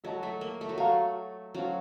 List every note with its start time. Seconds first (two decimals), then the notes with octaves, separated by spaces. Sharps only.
0.04 F#3 A4 D#5 A5
0.23 A3
0.41 A#3
0.61 A3
0.69 F#3
0.78 A3 F#4 A#4 F5 A#5
1.54 F#3 C#4 F4 A4 C5